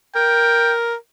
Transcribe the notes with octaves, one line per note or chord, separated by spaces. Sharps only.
A#4 G5